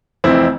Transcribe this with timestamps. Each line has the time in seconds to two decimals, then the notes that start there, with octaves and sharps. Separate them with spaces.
0.24 F1 F2 E3 C4 E4